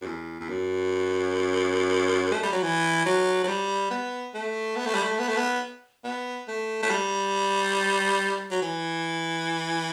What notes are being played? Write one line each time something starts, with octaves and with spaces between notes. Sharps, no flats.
F#2
E2
E2
F#2
A3
G3
F#3
E3
F#3
F#3
G3
B3
A3
B3
A3
G3
A3
B3
A3
B3
B3
A3
A3
G3
F#3
E3